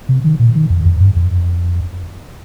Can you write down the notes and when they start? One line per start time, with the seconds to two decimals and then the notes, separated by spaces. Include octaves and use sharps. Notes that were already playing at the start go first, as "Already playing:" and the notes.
0.09 C3
0.24 D#3
0.39 A#2
0.55 D#3
0.70 F2
0.85 F2
1.00 G2
1.16 F2